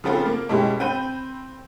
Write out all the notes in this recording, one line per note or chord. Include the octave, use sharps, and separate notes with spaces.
C#3 F3 B3 C4 F4 A4
A#3
B2 G3 G#3 C#4 E4 G4
C4 B5 G6 D#7